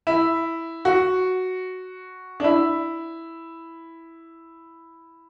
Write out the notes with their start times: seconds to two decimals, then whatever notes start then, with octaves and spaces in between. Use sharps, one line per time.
0.07 E4
0.85 F#4
2.40 D4
2.44 E4